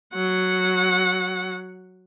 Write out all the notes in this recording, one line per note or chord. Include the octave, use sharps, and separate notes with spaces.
F#3 F#5